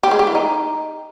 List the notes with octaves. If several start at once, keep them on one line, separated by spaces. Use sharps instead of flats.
G4
G#3
G4
E3
D#4